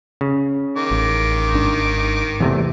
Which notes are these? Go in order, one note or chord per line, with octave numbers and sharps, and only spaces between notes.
C#3
D#3 D6
A1
G#1 G#2 D4
E2 C3 E3 A3